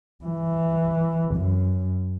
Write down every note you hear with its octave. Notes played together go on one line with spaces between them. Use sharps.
E3
F#2